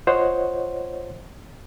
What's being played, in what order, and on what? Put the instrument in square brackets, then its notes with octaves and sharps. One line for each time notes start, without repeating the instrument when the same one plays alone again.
[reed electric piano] F4 C5 C#5 D#5 F#5